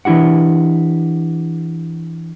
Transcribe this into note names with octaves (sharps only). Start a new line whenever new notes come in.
E3 D4 E4 G4 F#5